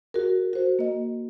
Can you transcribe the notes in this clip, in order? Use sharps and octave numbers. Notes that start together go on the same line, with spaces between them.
F#4 G#4 A#4
F#4 C5
A#3 D#5